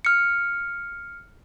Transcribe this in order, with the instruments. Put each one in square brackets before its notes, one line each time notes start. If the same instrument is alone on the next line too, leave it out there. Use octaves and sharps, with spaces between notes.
[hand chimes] F6 C#7